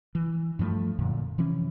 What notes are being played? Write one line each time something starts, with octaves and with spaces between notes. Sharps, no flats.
E3
G2 F3 G3 A3
F#2 A#2 D3
C3 E3 F3 C#4